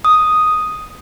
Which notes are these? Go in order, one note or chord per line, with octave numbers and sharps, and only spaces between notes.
D#6